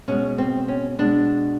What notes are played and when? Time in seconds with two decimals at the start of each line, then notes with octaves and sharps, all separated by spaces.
0.08 B2 G#3 C#4
0.38 C4
0.68 C#4
0.98 B2 G#3 D4